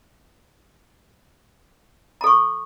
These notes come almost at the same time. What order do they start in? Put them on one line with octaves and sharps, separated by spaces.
A#5 A4 C#6